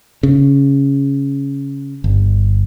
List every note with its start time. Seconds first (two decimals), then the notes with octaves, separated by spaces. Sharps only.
0.23 C#3
2.04 G1